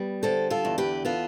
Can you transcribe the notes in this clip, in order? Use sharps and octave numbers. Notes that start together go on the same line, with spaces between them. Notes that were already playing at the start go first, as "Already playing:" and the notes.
Already playing: G3 B3
D3 A4 C5
F4 A4
E2
G4 B4
B3 F4 A4